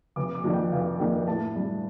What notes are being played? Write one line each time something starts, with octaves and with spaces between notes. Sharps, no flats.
F1 D6
D6
F2 D#3 A#3 D4
G5
F1 F5
F2 D#3 A#3 D4 G5
A2 A5
G3 D4